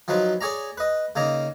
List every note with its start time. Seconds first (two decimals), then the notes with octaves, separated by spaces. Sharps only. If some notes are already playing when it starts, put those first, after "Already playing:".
0.08 F3 F#3 D#4 B4
0.41 G#4 C#5 D5 A#5
0.78 B4 D#5
1.16 C#3 A#3 D#4 A#5